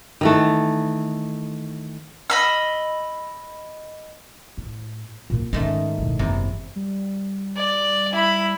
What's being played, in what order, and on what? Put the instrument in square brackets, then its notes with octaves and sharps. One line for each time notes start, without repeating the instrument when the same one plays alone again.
[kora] D#3 E3 A3
[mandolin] D#5 B5 E6
[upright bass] A2
A#2 A#3
[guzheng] G#2 D#3 A3 [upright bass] C#4
[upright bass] E1 A2
[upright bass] F#1 [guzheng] E2 C3 A#5
[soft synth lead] G3
[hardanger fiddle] D5
E4 B5